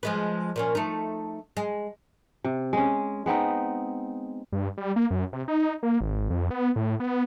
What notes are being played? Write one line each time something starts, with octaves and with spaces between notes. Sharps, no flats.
F3 G#3 B4
A#2 A#3 C#4
A3 D#4
G#3
C3
G#3 C#4
G#3 B3 C4 D#4
G2
G3
A#3
F#2
C3
D#4
A#3
G#1
F2
B3
A2
B3